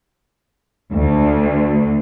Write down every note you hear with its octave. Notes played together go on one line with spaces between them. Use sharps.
D2